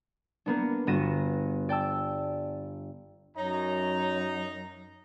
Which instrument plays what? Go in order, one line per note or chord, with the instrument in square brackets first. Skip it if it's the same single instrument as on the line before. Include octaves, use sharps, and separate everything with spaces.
[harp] A#3 B3 D4
G1 B3 F#4 A#6 D#7 E7
D5 G5 A5 E6
[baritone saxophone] F#2 [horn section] D#4 A#5 [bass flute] C#5